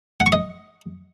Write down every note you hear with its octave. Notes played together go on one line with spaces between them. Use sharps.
F#5
C#6
D#5